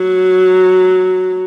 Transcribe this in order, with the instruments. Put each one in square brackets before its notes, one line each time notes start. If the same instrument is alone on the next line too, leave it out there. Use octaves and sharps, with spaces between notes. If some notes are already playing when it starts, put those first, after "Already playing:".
Already playing: [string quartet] F#3